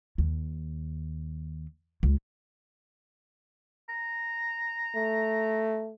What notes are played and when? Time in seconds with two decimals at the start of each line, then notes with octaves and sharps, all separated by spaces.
0.18 D#2
2.03 C#2
3.89 A#5
4.95 A3